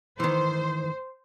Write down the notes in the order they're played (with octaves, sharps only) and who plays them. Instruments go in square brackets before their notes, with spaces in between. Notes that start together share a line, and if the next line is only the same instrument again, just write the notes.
[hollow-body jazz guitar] D#3 E3 [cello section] C5